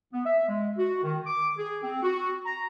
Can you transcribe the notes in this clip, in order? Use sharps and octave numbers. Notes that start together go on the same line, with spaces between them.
B3
E5
G#3
F#4
D#3
D6
G#4
C4
F#4
A#5